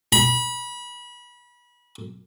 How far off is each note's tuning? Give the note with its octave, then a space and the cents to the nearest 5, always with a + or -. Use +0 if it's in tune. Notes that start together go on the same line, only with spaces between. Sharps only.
B5 -30